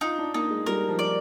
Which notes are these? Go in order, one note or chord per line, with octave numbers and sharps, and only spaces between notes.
D#4 F4
D4
A#3 D#4
G#3
G3 A#4
F3
D5